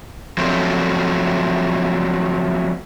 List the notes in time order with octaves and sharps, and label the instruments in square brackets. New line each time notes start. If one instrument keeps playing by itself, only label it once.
[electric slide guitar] F3 F#3 A3 C4